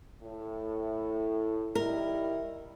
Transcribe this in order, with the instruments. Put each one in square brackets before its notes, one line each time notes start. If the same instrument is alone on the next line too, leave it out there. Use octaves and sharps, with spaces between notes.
[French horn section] A2
[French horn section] D#3 G3 E4 [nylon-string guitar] A#4